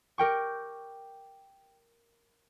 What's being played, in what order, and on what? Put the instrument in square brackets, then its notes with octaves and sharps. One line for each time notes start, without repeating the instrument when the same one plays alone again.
[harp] G4 A#4 G5 C#6